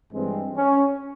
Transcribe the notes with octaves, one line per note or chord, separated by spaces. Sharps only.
G2 E3 G#3 C4
C#4